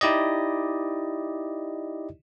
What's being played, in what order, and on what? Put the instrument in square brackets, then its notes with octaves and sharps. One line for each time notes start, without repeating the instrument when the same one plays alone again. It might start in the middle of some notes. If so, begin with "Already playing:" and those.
[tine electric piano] D#4 E4 G4 D5 D#5